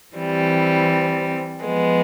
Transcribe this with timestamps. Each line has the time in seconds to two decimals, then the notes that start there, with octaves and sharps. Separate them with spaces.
0.16 E3 G3 C4
1.65 F3 G#3 B3